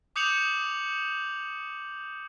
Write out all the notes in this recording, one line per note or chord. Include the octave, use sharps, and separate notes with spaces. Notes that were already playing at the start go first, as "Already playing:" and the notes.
D6 D#6 G6 C#7 F7 F#7